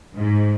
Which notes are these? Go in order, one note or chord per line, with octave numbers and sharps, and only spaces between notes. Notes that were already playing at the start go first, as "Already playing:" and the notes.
G#2